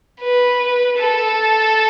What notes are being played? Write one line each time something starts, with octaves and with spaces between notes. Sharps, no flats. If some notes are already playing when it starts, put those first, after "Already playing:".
B4
A4